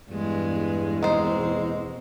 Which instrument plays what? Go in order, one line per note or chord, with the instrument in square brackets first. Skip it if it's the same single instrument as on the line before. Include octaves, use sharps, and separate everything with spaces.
[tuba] E2 [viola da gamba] G2 G#3
[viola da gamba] B2 C4 [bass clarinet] G#3 [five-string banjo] D#4 C5